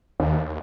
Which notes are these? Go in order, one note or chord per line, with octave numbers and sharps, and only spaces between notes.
D#2